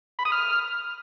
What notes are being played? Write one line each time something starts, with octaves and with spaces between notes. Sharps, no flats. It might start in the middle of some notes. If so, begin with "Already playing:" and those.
B5
D#6
F6